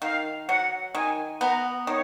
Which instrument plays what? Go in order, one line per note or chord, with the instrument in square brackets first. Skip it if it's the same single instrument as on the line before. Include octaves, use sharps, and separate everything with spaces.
[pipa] D#3 [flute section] F5
[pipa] F#3 [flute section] F#5
[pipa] D#3 [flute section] G#5
[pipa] B3 [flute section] A#5
[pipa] D#3 [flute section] C#5